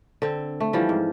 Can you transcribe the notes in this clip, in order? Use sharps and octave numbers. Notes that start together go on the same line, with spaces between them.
D3 C4
A3
E3 F3 G3
G#2